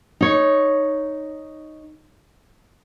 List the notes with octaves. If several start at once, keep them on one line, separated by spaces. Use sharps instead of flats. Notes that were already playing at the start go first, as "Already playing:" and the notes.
D#4 C#5